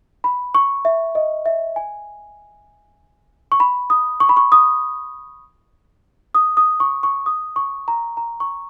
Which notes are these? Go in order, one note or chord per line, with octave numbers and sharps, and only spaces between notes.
B5
C#6
E5
D#5
E5
G#5
C#6
B5
D#6
C#6
B5
C#6
D#6
D#6
D#6
C#6
C#6
D#6
C#6
A#5
A#5
C#6